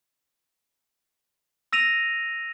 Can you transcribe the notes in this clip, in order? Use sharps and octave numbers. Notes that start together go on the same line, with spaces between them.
E6 A#6 D#7 F7